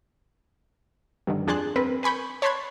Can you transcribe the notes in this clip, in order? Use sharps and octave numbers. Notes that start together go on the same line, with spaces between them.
G2 D3 D#3
F2 D4 G#4 A5 C6 F#6
C4 A#4 B4
B4 G#5 B5 C#6 G6
C#5 A5 B5 C6 F#6 G#6